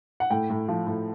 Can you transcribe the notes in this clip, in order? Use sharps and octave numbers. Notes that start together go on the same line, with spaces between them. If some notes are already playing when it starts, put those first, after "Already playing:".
F#5
A2 G5
A2
F3
A2